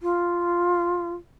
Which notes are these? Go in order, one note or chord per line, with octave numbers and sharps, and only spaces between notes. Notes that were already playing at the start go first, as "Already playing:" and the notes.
F4